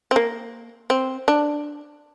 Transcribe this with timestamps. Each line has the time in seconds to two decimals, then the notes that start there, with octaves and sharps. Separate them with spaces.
0.11 C4
0.16 A#3
0.90 C4
1.28 D4